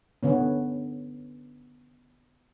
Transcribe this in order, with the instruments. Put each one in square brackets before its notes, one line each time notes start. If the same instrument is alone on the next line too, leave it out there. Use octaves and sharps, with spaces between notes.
[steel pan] D3 B3 C#4